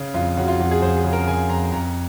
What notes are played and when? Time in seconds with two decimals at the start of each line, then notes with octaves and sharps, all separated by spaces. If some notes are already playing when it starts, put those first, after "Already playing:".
Already playing: C#3
0.14 F2 F4
0.37 C#3 F#4
0.48 F4
0.60 F2 F#4
0.71 G#4
0.82 F2 C5
0.97 G#4
1.04 C#3
1.13 A#4
1.27 C#3 G#5
1.50 F2 A#5
1.72 F2 A#5